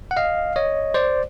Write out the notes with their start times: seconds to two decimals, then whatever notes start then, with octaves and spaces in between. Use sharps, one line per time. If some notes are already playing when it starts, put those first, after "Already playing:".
0.11 F#5
0.17 D#5 F5
0.56 C#5 D#5
0.94 C5 D5